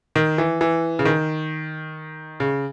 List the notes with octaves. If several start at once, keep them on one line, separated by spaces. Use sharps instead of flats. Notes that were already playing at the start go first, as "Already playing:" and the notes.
D#3
E3
E3
C#3
D#3
C#3